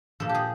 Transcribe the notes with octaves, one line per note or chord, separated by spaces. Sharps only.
A#2 F3 A4
G4
G#4